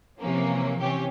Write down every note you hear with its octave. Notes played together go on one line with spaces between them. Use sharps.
C3 E3 F3 A#3 C#4
C3 E3 C#4 G4